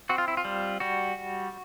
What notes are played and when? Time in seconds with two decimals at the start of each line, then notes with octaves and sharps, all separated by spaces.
0.09 C4 F#4
0.18 F4
0.28 E4
0.37 F4
0.45 G3
0.80 G3 F#4